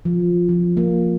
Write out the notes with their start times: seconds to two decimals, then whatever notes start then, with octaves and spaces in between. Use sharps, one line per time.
0.05 F3
0.49 F3
0.77 A#3